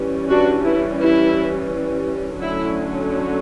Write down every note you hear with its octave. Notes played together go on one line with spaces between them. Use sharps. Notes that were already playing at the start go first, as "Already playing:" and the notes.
Already playing: E3 G3 C#4
D4 F#4
E4
E4
D3 F#3 A3 C#4 E4